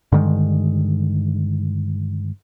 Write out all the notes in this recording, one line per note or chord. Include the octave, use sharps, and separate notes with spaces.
G2 D3 D#3 G#3